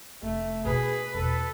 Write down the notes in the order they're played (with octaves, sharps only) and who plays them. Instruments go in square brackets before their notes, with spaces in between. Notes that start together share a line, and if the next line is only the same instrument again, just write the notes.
[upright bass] F1 [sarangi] A3
[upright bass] B2 D#4 [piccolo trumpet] G#4 [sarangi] B4
[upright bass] E2 B2 [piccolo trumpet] A4